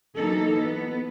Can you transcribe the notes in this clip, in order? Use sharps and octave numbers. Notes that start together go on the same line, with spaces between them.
E3 F#3 A#3 D#4 A4
B3